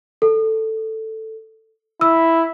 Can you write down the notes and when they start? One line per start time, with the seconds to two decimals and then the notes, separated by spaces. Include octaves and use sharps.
0.22 A4
2.01 E4 E6